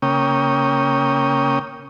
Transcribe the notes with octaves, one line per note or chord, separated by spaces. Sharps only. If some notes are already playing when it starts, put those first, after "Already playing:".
C#3 A#3 C#4 G5 D#6